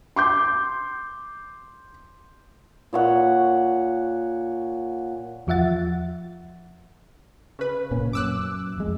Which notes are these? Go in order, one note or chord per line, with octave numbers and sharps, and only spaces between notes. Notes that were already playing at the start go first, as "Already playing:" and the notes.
C6 D6 G6
A#2 C#5 F#5
E2 F3 F4 E5 F#5 A6
C#3 B4
A#2 A#3 C#4
F#2 D6 E6 F#6
F2 G#3